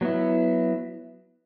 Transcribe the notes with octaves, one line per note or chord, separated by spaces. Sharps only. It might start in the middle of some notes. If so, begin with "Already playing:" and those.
F#3 B3 E4